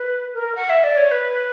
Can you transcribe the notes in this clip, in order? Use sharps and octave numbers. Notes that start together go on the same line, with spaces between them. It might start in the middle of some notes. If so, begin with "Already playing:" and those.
Already playing: B4
A#4
F#5
E5
D5
C#5
B4